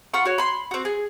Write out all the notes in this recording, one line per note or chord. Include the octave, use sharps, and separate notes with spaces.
F4 F#5 B5 C#6
F#4 C#5
B5 C6
C4 F#4
G#4